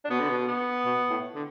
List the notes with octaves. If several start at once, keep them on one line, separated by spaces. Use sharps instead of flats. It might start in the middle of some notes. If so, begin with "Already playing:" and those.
D4
B2 B3
D3
B2
B3
B2
A2
D3